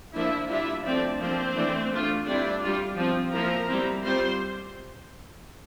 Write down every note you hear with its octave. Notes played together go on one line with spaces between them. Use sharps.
F3 A#3 D4 E4 E5
G3 D4 E4 F4 E5
F3 A3 C4 D4 D5
F3 A#3 C4 D4 C5
E3 A3 D4
A3 D4 F4
G3 C4 D4 E4 D5
G3 D4 F4
F3 C4 F4
F3 A#3 E4 A#4 A#5
G3 C4 E4
G3 C4 F4 C5 C6